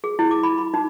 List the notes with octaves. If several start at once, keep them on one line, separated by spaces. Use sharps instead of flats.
G#4
E4
D6
B5
B5
D#4